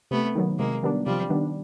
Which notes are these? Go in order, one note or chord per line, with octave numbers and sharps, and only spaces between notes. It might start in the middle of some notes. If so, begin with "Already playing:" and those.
C3 A3 B3
D#3 F#3 B3
C3 G#3 A#3
D#3 G3 B3 D4
C3 F3 G3
D#3 G3 B3 D4